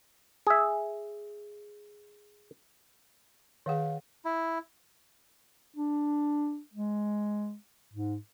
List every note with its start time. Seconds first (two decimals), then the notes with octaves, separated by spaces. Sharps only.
0.47 G#4 E5
3.66 D#3 G#4 C#5 F5 F#5
4.25 E4
5.76 D4
6.74 G#3
7.93 G#2